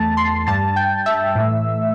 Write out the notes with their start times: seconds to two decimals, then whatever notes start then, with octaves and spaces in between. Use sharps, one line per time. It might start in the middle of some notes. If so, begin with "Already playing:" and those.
Already playing: E2 E3 A3 A5 A6
0.17 C6 C7
0.47 G2 G3 A5 A6
0.76 G5 G6
1.06 E5 E6
1.35 A2 E3 A3